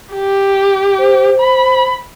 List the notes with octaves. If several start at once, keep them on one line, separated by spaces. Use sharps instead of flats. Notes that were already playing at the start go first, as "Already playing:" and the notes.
G4
C5
B5